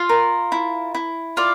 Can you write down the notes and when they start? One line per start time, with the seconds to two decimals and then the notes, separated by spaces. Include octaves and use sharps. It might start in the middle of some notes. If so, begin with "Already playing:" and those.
Already playing: F4
0.09 A#4
0.52 E4
0.95 E4
1.37 F4 D5